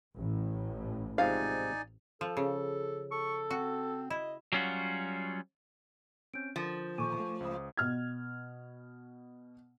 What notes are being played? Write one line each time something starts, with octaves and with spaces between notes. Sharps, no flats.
A1 A2
G#2 C3 F3 D#4 D5 F5 G#5
F3 A4
C#3
A4 C#6
C4 F#4
E4 D#5
F#3 G3 C#4 F4 F#4
C4 C#4 G6 D7
D3 F3 A#4 D#6 A6
A#2 D#3 A#3 A4 G#5 C#6 D6 D#7
A3
C#2 C5 D6 D#6
B2 F6 G#6